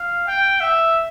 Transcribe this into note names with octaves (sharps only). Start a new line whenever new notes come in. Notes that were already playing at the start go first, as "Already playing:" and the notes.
Already playing: F5
G5
E5